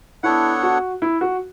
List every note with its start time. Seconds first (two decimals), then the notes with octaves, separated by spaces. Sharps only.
0.23 B3 D4 E4 A4 C#5 F#5
0.63 F#4
1.02 E4
1.21 F#4